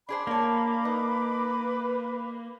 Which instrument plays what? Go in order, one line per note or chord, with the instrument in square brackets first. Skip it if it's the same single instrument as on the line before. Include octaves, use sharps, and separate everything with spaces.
[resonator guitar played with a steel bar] D4 G#4 C5 [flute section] B5 D6
[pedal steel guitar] A#3 [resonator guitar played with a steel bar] D4 C#5
[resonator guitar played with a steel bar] D#4 [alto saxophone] B4